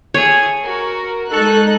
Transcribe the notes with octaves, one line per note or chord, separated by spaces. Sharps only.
A3 G#4 C#5
F#4 A#4
G#3 D#4 A4 C#6 F#6